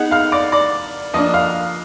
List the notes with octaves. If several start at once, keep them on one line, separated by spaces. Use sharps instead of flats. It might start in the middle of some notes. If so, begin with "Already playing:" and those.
Already playing: B3 D#4 G#4 F#5 F#6
F5 F6
D5 D6
D5 D6
F3 A#3 D4 D#5 D#6
F5 F6